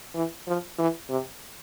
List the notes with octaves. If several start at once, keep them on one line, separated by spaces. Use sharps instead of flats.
E3
F3
E3
C3